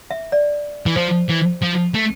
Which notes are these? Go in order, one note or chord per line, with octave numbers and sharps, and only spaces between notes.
E5
D5
E3
F3 C5
E3
F3
A3